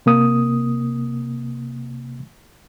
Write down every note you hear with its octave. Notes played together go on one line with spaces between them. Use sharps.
C3 A#3 D#6